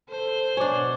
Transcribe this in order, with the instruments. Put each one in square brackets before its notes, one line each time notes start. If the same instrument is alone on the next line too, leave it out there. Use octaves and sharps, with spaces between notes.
[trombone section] A4 [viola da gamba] C5
[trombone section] B2 [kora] D4 C#5 [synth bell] G#5 D6